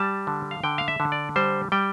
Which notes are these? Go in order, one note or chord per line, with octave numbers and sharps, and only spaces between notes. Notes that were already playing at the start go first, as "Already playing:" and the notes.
Already playing: G3 A5
D3
F5
D3 G5
F5
E5
D3
D5
G3 C5
G3 G5